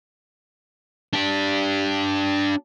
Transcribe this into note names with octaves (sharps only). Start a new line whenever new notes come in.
D4 G4